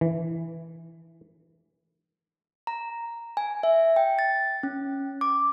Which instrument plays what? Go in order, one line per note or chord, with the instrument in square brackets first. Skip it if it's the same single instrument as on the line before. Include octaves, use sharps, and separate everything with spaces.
[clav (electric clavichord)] E3
[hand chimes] A#5
G#5
E5
G5
A6
C#4
D6